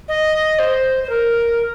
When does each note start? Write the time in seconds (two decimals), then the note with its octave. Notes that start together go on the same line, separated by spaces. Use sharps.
0.08 D#5
0.59 C5
1.04 C5
1.10 A#4